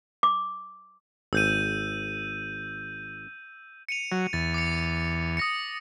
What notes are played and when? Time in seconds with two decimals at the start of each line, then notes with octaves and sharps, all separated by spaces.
0.23 D6
1.33 G#1 E6 G6 D#7
3.89 C#7 D#7 F7
4.12 F#3
4.33 E2 A6
4.54 D6 C#7
5.37 D#6 A#6 C#7